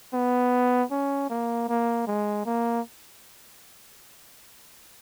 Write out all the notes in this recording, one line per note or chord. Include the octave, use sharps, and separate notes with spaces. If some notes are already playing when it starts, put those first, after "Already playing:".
B3
C#4
A#3
A#3
G#3
A#3